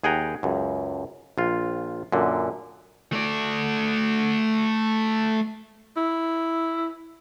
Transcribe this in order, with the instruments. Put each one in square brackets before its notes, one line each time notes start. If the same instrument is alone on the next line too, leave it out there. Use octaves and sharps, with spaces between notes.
[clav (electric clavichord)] D#2 G#4 F#5 G5 A#5
C#2 F#2
A#1 F4
F#2 A#2 D3
[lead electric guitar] A3 D5
[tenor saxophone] E4